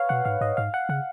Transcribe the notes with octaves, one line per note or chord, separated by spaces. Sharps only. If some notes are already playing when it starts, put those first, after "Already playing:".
Already playing: B4 C#5 F5
B2 F#5
G#2 F5
G#2 D#5
G#2 F5
F#5
C#3 F#5